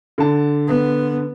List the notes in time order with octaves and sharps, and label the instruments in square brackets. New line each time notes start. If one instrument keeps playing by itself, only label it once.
[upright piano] D3 A5
[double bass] B3